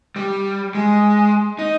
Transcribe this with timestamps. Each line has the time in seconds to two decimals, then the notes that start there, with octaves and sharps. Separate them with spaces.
0.16 G3
0.75 G#3
1.59 D#4